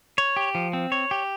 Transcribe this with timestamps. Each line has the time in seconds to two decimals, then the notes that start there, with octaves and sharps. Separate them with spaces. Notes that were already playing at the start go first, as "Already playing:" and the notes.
0.18 C#5
0.36 G4
0.55 F3
0.73 C4
0.92 C#5
1.11 G4